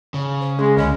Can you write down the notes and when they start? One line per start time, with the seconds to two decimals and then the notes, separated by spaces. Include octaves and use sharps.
0.14 C#3
0.41 C5
0.59 G#3 C#4 G#4
0.77 C#2 D3 C#4 D#5 B5